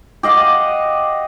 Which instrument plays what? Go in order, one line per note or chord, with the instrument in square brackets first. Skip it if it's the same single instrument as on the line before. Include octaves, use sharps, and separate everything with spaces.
[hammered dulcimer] G4 D#5 F5 F#5